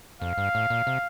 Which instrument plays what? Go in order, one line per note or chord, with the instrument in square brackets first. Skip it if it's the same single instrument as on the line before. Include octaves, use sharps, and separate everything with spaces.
[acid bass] F2 [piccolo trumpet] F5
[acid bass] G2
A2
A#2
C3